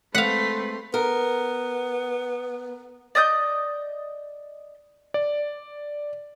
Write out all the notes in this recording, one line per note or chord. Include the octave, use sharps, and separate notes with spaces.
G#3 A3 C4 B4 F5 F#5 C6 B6
B3 A#4
D5 D#5 D#6 G6
D5